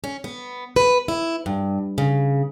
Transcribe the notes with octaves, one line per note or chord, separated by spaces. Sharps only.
C#4
B3
B4
E4
G2
C#3